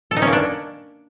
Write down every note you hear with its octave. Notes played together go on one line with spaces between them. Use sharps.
A4
D#4
C#4
A#3
D4